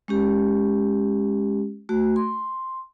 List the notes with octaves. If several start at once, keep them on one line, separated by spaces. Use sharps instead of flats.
G#3 C#4 G4
A3 F#4
C6